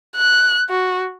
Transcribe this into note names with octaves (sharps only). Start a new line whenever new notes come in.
F#6
F#4